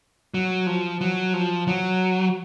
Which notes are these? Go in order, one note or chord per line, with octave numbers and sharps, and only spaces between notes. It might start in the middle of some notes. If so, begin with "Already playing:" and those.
F#3
F3
F#3
F3
F#3